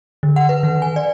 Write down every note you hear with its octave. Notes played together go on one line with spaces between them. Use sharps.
D3
F#5
B4
D#3
G#5
D5